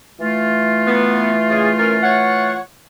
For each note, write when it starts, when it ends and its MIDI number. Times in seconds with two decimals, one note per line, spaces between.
0.20 2.58 52
0.20 2.58 57
0.20 2.58 65
0.86 1.32 59
1.49 1.68 49
1.49 1.68 56
1.49 1.68 68
1.77 1.96 61
1.77 1.96 70
2.03 2.59 73
2.03 2.59 78